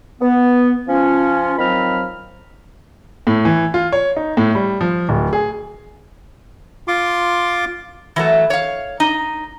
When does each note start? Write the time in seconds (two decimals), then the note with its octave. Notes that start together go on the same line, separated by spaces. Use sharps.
0.22 B3
0.89 F3 C#4 F4
1.59 D#3 F3 F#3 C4 B5 F6
3.27 A2
3.45 E3
3.74 F4
3.92 C#5
4.16 D#4
4.37 A2
4.55 G3
4.81 F3
5.09 D1
5.33 G#4
6.88 F4 C6 D6
8.16 E3 F#3 A3
8.50 C#5 F5
9.00 D#4